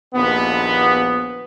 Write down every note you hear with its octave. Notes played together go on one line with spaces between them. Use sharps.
A#1 D#2 B3